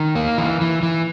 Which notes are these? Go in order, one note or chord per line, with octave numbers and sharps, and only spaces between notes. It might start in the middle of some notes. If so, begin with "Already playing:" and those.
Already playing: D#3
A#3
E3
E3
E3